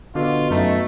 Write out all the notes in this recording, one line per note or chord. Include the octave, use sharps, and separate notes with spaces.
B2 D3 F4
F#2 A3 D#4